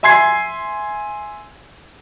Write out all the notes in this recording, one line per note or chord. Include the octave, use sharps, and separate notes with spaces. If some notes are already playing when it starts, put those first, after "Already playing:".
E5 G#5 C6 G#6 C7